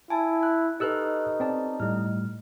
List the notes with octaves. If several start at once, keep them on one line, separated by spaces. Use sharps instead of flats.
E4 G#5 A5
F#6
D#4 G4 A4 B4 D#5 E6 F#6
C4 D5 A5
A2 G3 A3 F6